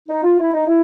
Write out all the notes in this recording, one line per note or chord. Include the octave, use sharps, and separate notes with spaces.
D#4
F4
E4
D#4
E4